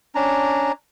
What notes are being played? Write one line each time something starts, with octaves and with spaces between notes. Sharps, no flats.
C#4 D4 A#5